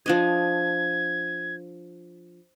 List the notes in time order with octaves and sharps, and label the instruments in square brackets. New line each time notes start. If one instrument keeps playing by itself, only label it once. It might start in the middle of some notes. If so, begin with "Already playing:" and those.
[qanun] F3 D4 D#5 [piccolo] G#6